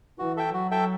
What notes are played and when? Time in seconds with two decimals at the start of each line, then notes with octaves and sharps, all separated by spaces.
0.19 E3 F#4
0.37 A4 E5 G5
0.54 F#3 F#4
0.71 A4 E5 G5